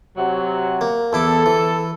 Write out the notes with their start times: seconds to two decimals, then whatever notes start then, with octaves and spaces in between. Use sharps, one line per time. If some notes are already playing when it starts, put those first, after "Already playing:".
0.17 C3 F#3
0.81 A#3
1.13 E2 E4 A4 D6
1.46 E3